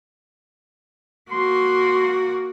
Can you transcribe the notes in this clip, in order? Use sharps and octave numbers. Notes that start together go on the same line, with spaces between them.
A#3 F#4 C6